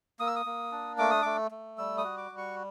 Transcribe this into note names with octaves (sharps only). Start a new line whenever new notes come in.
A#3 D#6
E6
D#6
A#3
D4
A3 D6
D#6
A3 D6
A3
G3 E6
D#6
F#4
D6
G3
C#6